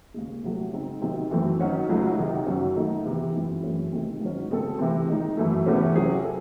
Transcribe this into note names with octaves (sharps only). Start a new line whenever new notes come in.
D#2 C#3 G#3
C3 F#3 A3
C#3 G#3 C4 D#4
C3 D#3 F#3 C4
F#2 E3 A3 C4
D#3 F#3 C#4 F#4
C#2 C#3 F#3 A3 D#4
C3 D#3 F#3
F#2 C#3 F#3 C#4 F#4
D#3 A3 D#4
E2 C3 E3
F#2 E3 G#3 C4 E4
F#2 E3 A3 C#4 G#4
C3 D#3 A3 C4
G#2 D#3 F#3 C#4
C#3 G#3 C4 F#4 A4
C3 E3 A3 C4
D#3 G#3 D#4
F#2 E3 A3
E2 C3 E3 A3 C#4
C3 F#3 C#4 G#4
A4